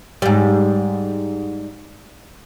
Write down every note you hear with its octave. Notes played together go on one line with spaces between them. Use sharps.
G#2 G3